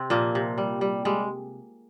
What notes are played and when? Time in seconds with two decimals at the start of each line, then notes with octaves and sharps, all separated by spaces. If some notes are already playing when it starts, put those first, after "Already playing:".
Already playing: C3 C4
0.10 A#2 F3 A#3
0.35 C3
0.58 G3
0.81 G3
1.05 G3 G#3